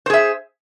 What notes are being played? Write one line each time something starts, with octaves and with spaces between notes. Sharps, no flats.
G#4 C5 E5